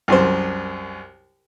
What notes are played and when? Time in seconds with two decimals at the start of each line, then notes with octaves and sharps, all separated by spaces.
0.08 C2 F#2 C5